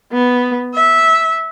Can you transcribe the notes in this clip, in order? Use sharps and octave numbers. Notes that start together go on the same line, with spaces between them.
B3
E5